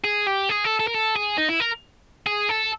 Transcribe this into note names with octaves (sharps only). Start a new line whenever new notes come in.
G#4
G4
G#4
A4
A4
A#4
A4
G#4
D#4
E4
A#4
G#4
A4